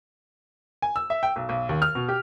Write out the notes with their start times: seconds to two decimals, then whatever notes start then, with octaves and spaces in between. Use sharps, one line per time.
0.82 G#5
0.96 E6
1.10 E5
1.23 G5
1.36 B1
1.49 B1
1.69 D#2
1.82 F6
1.95 B2
2.08 G4